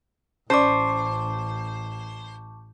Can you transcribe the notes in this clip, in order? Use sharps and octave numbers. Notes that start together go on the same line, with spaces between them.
A1 C#4 C5 D5 A5 C#6 D6